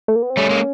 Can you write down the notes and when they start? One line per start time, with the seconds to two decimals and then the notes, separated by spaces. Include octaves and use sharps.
0.08 A3
0.16 A#3
0.22 B3
0.30 C4
0.37 G3 A3 C#4
0.50 G#3 A#3